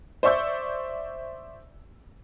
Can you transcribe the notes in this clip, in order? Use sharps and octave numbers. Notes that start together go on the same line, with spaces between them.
C5 D5 E5 C#6 E6 G6